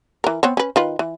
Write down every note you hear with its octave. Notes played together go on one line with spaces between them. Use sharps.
E3 A#4
B3 C4 C#5
C#4 B4
D#3 F4 B4
E3